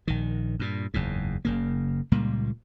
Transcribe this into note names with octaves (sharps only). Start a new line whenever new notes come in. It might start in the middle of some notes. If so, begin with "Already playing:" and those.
A#1 D#3
G2 A#2
F#1 E2 G#2
F#1 C#3 A#3
C#2 A#2 G3 A#3